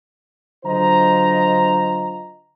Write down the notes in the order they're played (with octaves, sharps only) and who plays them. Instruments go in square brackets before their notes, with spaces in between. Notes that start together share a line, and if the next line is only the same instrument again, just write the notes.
[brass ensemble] D3 F#3 F4 C5 D#5 A#5